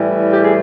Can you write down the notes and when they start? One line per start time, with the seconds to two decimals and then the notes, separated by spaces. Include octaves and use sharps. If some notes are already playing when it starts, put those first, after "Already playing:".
Already playing: A2 E3 G3
0.29 G4
0.41 G#4